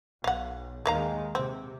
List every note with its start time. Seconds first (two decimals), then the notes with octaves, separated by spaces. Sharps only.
0.24 B1 F5 F#5
0.86 D#2 D#3 G#3 A#4 F5 A#5
1.35 C3 C4